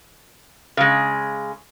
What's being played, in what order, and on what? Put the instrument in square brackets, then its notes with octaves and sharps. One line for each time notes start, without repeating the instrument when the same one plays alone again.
[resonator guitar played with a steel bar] C#3 G#3